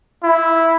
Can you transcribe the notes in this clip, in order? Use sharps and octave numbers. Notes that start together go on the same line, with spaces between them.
E4